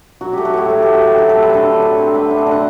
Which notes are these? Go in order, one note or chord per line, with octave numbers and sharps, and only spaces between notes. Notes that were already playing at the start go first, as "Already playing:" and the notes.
F#3 F#4
A3 G4
F#4
A2 E4
A2 F#4
F#3 G4
F#4
A3
G4
F#3 F#4
C4 A4
B4
D3 A4
D3
F#3
C4
A3 B4
D4
A4
D3 F#5